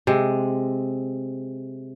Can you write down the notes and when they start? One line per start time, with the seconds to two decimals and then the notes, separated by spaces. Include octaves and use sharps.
0.07 C3 G#3